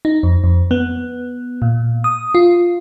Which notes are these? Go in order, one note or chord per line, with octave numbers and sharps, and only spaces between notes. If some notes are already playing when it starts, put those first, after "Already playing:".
D#4
F2
F2
B3
A#2
D#6
F4